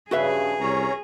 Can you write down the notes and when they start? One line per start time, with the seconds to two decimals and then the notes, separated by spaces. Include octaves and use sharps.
0.11 G2 C#3 F#4 G#4 B4 E5
0.60 C2 C#4 C#5 A#5